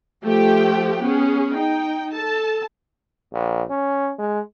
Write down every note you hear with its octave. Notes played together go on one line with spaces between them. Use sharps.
F3 A3 G4 G5
B3 C#4 G#4
D#4 G5
A4 A5
A#1
C#4
G#3